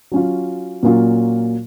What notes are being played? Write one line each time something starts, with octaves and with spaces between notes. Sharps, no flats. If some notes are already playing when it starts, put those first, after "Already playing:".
F#3 C#4 F4
A#2 F#3 A#3 C#4 F4